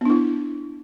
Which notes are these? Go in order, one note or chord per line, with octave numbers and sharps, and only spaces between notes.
B3 D4 E4